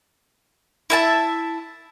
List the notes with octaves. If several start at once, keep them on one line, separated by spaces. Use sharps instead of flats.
E4 E5 A5